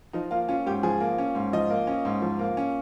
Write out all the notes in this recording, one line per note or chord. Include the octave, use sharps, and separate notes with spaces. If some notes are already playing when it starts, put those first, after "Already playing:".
F3 D#4
A#3 F4
C#4 F4
G#2 G4
F3 G#4
A#3
C#4
G#2
F3 D#5
A#3
C#4
G#2
F3
A#3
C#4